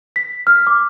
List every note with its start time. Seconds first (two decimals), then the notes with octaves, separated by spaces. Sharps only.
0.16 B6
0.47 F6
0.67 D6